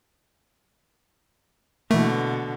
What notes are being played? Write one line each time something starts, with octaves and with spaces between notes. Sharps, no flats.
B2 D3 E3 A3 A#3